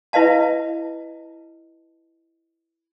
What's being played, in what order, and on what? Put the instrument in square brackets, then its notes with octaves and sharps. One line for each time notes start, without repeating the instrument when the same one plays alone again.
[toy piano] E4 B4 D#5 F5 A5